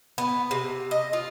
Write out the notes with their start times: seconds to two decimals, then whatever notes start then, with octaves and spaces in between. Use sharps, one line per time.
0.18 B3
0.51 C3
0.91 D#5
1.13 F4